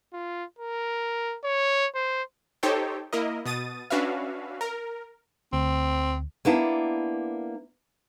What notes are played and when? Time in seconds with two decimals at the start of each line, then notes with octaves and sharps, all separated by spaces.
0.13 F4
0.59 A#4
1.44 C#5
1.95 C5
2.63 D#4 G4 A4 C5 C#5 G5
3.13 A#3 E4 A#4 D#5
3.45 B2 D#6 A6 D#7
3.90 C#4 D4 F#4 B4 E5 F5
4.61 A#4
5.53 D2 C4
6.45 A#3 B3 D4 E4